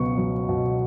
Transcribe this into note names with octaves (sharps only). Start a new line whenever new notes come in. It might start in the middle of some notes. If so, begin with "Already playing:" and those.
Already playing: C#2 B2 F#3 B3 C#6
F#3
B2